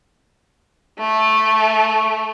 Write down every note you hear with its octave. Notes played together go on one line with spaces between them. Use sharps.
A3